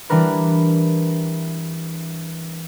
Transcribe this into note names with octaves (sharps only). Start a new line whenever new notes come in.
E3 G3 D4 A#4 B4